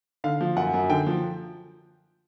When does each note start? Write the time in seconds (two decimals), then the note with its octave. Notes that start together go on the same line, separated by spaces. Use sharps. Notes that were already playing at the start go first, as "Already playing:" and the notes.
0.24 D3 F5
0.41 F3
0.56 F#2 F#5
0.74 F#2
0.90 D3 G5
1.07 F3